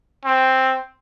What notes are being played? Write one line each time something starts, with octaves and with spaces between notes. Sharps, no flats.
C4